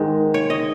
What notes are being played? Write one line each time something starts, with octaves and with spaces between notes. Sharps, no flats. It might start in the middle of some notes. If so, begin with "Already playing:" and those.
Already playing: G#2 D#3 G#3
C#5
D#5